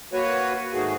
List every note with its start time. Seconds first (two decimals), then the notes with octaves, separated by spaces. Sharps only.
0.13 A#3 F#4 B4 C#5
0.73 G#2 D#3 A3 F#4 G#4